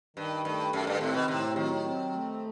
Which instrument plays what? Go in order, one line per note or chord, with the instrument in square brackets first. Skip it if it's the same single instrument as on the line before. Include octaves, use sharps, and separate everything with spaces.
[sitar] G2 [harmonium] D#3
[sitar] G2 [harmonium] A3
[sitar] F#2 [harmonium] D#3
[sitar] G2
[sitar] A2 [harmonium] C4
[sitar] B2
[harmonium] A2 [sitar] C3
[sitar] D#3 [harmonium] F#3
[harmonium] C4
A3